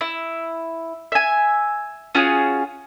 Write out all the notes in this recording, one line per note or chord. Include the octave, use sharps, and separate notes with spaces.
E4
E5 G#5
C#4 F4 F#4 G#4